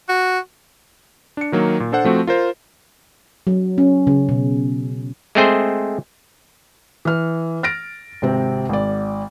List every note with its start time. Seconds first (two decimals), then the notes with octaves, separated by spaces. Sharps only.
0.09 F#4
1.37 D4 C#7
1.52 D#3 F#3 A#3
1.80 A#2
1.92 D4 A4 C5 F#5
2.04 F3 A3 C4 F#4
2.27 F4 A#4 C5
3.47 F#3
3.78 C#4
4.07 C#3
4.29 B2
5.35 G#3 A3 C4 G#4 C5
7.05 E3 F6
7.63 F6 A6 A#6 D7
8.22 G#1 C3 C4
8.69 G#1 D5